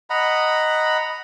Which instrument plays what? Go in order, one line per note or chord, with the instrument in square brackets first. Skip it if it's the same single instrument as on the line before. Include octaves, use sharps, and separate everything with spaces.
[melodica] D#5 F#5 A#5 B5